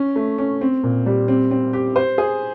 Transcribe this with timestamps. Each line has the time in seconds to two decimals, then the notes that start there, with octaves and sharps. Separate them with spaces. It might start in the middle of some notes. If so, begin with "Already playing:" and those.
Already playing: C#4
0.16 A3
0.38 C#4
0.61 C4
0.83 A#2
1.06 G3
1.28 C4
1.51 C4
1.73 G4
1.96 C5
2.18 G#4